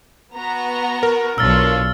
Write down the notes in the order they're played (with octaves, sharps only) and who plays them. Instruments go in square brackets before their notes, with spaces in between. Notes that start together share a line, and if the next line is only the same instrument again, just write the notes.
[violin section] B3 F#4 A#5
[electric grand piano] A#4
[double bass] B1 [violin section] D4 F4 C#5 [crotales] E6 F6 A6